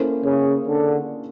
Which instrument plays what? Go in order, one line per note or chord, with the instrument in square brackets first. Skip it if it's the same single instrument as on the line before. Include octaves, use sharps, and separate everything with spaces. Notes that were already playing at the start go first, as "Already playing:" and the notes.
Already playing: [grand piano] A#3 C#4 E4 A4 C5
[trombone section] C#3
D3